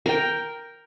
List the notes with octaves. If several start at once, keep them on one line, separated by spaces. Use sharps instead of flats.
A#4 G5